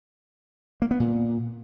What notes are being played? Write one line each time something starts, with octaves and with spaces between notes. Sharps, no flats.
A#3
B3
A#2